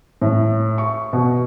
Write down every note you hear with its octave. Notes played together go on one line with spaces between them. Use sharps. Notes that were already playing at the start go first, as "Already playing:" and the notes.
A2
C#6
B2